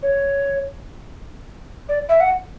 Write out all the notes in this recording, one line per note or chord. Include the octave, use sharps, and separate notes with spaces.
C#5
D5
E5
F#5